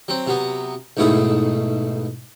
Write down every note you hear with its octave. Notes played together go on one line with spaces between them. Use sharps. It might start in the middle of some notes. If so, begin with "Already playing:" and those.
F#3 C4
C3 F#3 B3
B1 G#2 B2 A3 E4 G#4